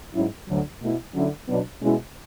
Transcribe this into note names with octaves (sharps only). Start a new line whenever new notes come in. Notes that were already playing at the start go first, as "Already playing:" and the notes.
G#2 F#3 C#4 E4
D2 D3 F#3
B2 A3 E4
D3 F#3 C#4 E4
B2 F#3 B3 D4
B2 G#3 C#4 E4